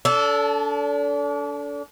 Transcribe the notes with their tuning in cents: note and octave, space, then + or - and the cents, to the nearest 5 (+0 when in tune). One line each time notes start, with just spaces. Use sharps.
D4 -35 A4 +0